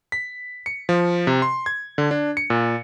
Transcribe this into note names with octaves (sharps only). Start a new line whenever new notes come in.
B6
C#7
F3
C3
C6
G#6
D3
D4
C#7
A#2